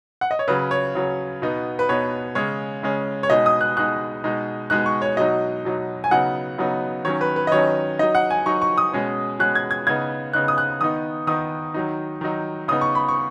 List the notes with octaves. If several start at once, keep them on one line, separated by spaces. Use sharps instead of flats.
F#5
D#5
C#5
C#3 F#3 C#4 B4
C#5
C#3 F#3 C#4
B2 B3 D#4
B4
B2 B3 D#4 C#5
C#3 G#3 C#4 C#5
C#3 G#3 C#4
C#5
B2 G#3 D#4 D#5
D#6
F#6
B2 G#3 D#4 F#6
B2 G#3 D#4
B2 G#3 D#4 F#6
C#6
C#5
B2 F#3 D#4 D#5
B2 F#3 D#4
G#5
C#3 F#3 B3 D#4 F#5
C#3 F#3 B3 D#4
D#3 F#3 C#4 C#5
B4
B4
D#5
D#3 F#3 C#4 C#5
F#3 D#4 D#5
F#5
G#5
F#3 D#4 C#6
C#6
D#6
B2 G#3 C#4
B2 G#3 C#4 F#6
G#6
G#6
C#3 B3 D#4 G#6
C#3 B3 D#4 F#6
D#6
F#6
D#3 B3 D#4 D#6
D#3 B3 D#4 D#6
D#3 F#3 D#4
D#3 F#3 D#4
C#3 B3 D#4 D#6
C#6
B5
C#6